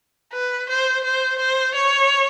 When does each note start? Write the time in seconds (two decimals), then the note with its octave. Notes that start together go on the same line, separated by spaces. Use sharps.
0.33 B4
0.69 C5
1.04 C5
1.39 C5
1.75 C#5